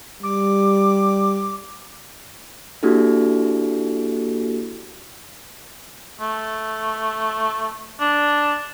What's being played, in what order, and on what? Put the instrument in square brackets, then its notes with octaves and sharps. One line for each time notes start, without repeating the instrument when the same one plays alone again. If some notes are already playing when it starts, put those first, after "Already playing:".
[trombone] G3 [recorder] D6
[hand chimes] A#3 D4 E4 F#4 G4 A4
[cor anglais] A3
D4